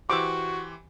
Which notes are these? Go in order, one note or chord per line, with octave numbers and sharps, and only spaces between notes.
E3 F#4 G4 C5 D6 E6